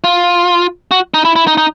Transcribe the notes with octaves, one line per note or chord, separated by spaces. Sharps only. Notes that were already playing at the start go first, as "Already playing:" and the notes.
F4
F#4
D#4
E4
E4
D#4
D#4